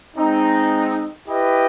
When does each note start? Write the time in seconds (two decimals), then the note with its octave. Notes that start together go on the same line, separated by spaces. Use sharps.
0.16 G#3 C4 D#4
1.28 E4 G4 B4 D#5 G5